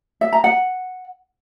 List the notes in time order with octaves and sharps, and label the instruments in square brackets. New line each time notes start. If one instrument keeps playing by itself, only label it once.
[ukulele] E5
A#5
F#5